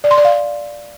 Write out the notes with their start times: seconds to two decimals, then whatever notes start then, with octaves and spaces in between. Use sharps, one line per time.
0.04 D5
0.11 C6
0.18 D5
0.25 F5